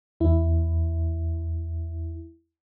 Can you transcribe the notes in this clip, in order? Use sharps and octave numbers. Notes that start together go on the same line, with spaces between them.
E2 E4